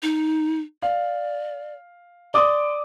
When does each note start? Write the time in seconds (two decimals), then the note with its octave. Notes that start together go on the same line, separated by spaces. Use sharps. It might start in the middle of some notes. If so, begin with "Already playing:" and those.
0.02 D#4
0.82 D5 F5
2.34 D5 C6 D6 D#6